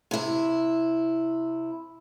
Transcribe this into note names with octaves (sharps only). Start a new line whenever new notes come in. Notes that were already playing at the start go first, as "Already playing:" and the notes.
C3 E4